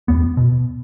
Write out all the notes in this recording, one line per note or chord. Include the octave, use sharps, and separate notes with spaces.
E2 B3
B2